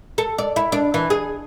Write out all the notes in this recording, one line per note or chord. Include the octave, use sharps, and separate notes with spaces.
A4
D5
E4
D4
E3
G#4